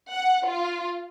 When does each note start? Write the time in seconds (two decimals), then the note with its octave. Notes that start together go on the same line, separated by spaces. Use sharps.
0.12 F#5
0.46 F4